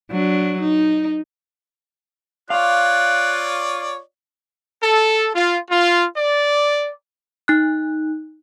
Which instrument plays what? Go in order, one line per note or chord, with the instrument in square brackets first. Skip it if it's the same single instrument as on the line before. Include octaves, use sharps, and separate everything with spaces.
[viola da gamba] F#3 D4
D#4
[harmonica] F4 C#5 D5 [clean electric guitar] F5 [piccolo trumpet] F#6
[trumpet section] A4
F4
F4
D5
[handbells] D#4 F#6